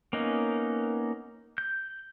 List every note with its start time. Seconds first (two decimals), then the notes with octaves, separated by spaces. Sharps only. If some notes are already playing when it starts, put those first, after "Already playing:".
0.13 A#3 B3 C#4 D#4
1.58 G6